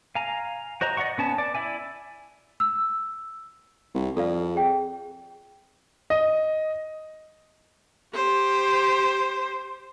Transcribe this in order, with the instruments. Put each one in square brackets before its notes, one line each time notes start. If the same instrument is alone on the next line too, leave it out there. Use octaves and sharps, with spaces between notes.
[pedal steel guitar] F5 G#5 A#5
F#4 C5 D#5 A#5
D5 D#5 F#5 C#6
B3 C#4 A5
D5
E4 D5 E5 G#5
[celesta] E6
[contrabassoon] C2
[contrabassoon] F2 [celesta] A4 D5 F5
[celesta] G#4 G5
[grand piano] D#5
[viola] G4 C5